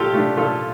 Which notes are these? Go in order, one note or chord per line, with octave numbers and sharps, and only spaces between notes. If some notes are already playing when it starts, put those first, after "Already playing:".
Already playing: A#2 A3 F4 G4 A4
A3 D4
A#2 F4 A4